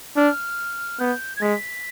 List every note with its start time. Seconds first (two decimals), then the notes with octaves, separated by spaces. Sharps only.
0.16 D4 F6
0.99 B3 G6
1.36 G#6
1.41 G#3 B6